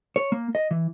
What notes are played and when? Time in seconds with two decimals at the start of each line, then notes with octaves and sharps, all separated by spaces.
0.16 C#5
0.32 A#3
0.55 D#5
0.71 E3